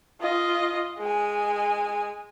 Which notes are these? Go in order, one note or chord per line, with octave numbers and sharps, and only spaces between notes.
F4 D#5
G#3 G#5